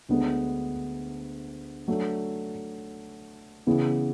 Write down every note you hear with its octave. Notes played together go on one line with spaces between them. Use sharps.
D2 D3 G#3 B3
F#3 A3 D4
C#3 E3 B3 E4 G#4